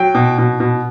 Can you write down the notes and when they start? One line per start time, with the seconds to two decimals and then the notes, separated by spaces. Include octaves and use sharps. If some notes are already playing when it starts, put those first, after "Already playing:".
Already playing: F#3 G5
0.15 B2
0.38 B2
0.60 B2